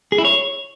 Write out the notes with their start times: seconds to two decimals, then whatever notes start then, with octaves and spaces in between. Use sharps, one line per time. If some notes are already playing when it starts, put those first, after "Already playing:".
0.12 G#4
0.18 E4
0.25 C#5